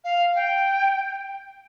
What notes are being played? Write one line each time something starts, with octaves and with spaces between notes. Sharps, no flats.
F5
G5